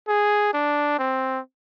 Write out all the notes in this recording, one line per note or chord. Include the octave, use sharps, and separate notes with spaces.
G#4
D4
C4